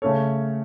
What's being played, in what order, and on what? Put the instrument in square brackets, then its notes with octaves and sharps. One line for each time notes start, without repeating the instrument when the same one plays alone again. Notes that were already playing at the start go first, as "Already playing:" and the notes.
[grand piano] C#3 A3 C#4 A4 C#5